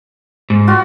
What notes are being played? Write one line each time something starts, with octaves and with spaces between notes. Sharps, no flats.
G#2
F4 F#4